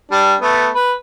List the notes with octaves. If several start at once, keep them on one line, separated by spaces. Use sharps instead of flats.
G3 D4
A3 B3
B4